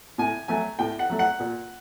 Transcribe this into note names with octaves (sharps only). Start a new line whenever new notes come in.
A2 G#5
F#3 A3 G#5
A2 G5
F#5
F#3 A3
F#5
A#2